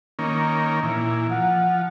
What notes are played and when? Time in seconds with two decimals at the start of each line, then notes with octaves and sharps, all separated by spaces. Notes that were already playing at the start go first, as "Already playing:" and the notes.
0.19 D#3 A#3 C#4
0.83 A#2 E3
1.31 F3 F#5